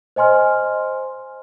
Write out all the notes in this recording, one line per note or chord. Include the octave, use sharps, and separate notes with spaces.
C5 D#5 G#5 C6 F6